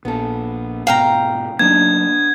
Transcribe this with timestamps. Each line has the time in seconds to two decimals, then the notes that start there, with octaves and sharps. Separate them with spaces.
0.05 A#1 B3 A4
0.87 G#2 B2 F5 G5 A#5
1.59 F#3 A#3 B3 D4 D#4 G#6